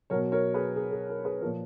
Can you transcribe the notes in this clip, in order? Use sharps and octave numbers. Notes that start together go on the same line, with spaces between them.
B2 F#3 A#4 C#5
A#4 C#5
G#4 B4
G#4
G#4
A#4
G#4 B4
A#2 F3 A#4 C#5